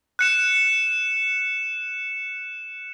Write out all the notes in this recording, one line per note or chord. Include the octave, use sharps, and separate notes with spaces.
F#6 C#7 E7